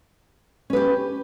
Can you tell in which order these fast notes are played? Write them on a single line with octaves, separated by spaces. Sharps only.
C#4 B4 G4